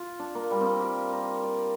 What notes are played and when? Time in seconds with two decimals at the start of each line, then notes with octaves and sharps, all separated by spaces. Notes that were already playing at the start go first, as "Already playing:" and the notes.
Already playing: F4
0.19 D4
0.35 A#3
0.51 G3
0.61 C4
0.66 A#3
0.81 G4
1.12 A#4
1.43 D5